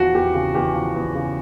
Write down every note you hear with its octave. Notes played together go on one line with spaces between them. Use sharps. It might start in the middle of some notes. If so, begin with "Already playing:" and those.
Already playing: E2 F3 F#4
E2 G4
C#3
E2 G4
F3
E2
C#3